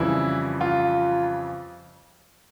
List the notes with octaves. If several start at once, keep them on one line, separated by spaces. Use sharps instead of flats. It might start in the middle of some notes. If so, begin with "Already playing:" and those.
Already playing: F2 C#3 E3 G3 E4
F4